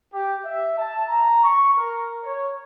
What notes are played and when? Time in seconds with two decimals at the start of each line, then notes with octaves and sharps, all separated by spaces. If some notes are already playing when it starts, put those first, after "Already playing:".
0.13 G4
0.45 E5
0.78 A5
1.08 A#5
1.43 C#6
1.76 A#4
2.24 C#5